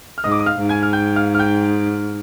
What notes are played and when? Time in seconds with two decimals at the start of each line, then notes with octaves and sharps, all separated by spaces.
0.18 F6
0.24 G#2 D#5 D#6
0.32 D6
0.40 D#6
0.46 F5 F6
0.59 G#2
0.69 G#5 G#6
0.83 F6
0.93 G5 G6
1.16 F5 F6
1.35 F6
1.39 G5 G6